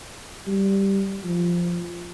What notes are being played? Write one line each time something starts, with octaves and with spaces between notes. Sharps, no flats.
G3
F3